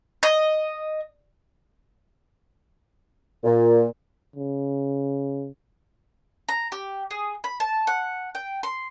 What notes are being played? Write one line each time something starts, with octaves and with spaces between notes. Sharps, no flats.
D#5
A#2
C#3
A#5
G4
G#4
B5
A5
F#5
G5
C6